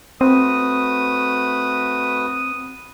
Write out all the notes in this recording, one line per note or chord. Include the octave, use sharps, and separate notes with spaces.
A3 C4 F#4 B4 D#6